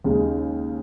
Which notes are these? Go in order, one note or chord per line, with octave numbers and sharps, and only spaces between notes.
D#2 C#3 G#3 D#4